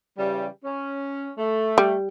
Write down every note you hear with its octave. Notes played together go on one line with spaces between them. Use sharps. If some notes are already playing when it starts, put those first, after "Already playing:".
C#3 E3 G3
C#4
A3
G3